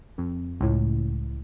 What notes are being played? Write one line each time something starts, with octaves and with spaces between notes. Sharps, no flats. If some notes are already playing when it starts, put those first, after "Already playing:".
F2
C#2 A2